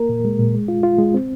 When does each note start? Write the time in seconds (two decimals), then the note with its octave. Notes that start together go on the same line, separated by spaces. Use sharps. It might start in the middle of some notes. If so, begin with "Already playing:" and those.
Already playing: A#3 A#4
0.09 A#2
0.25 G#3
0.39 A#2
0.54 G#3
0.68 F4
0.83 F4
0.98 G#3
1.14 C4